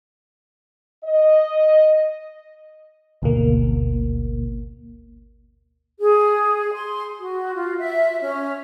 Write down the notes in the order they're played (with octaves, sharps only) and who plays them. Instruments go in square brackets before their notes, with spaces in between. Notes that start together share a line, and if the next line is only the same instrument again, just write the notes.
[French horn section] D#5
[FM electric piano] G#1 D2 B2 A#3
[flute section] G#4
C6
F#4
F4
E5
C#4